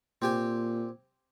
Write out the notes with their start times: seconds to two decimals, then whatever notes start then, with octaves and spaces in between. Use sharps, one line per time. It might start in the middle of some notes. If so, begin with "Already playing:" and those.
0.22 A#2 C4 G4 G#5